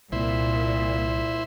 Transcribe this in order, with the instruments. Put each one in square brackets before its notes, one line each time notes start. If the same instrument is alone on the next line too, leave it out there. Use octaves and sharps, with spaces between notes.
[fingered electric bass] C2 [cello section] A#2 [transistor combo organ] E4 C5